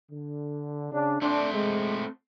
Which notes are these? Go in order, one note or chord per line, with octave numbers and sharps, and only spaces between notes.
D3
C#3 D4
A3 C4 D4 C5
G#3